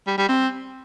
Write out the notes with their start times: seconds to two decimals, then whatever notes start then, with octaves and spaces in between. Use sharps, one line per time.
0.07 G3
0.18 G3
0.29 C4